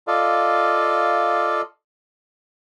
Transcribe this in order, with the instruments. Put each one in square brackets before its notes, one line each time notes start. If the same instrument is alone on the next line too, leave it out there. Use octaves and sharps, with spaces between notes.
[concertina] F4 A4 D5 D#5 F5